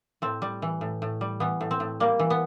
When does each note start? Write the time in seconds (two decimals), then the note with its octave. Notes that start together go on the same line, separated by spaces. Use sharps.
0.22 A2 C4
0.42 G3
0.62 E3
0.81 A2
1.02 A2
1.21 G3
1.40 E3 B3
1.61 A2
1.71 C4
1.80 A2
2.00 G3 A#3
2.19 E3
2.30 B3